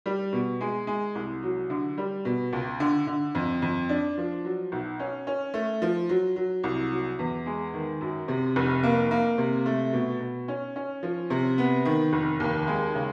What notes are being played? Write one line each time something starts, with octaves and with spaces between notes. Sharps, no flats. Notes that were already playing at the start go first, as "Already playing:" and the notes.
G3
B2
G#3
G#3
C2
F#3
D3
G3
B2
C#2
D3
D3
F2
F2
D4
F3
F#3
B1
C#4
C#4
A3
F3
F#3
F#3
C2
F#3
E2
G#3
D#3
F#2
C3
F1
A#3
A#3
C3
A3
B2
B2
C#4
C#4
F3
C3
B3
D#3
F1
D#2
G#3
C#3